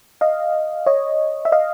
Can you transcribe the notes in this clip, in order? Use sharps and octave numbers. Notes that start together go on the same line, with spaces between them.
D#5 F5
C#5 D#5
E5
D#5 F5